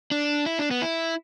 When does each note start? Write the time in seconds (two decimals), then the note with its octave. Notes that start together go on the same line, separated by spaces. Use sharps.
0.11 D4
0.46 E4
0.59 D4
0.71 B3
0.82 E4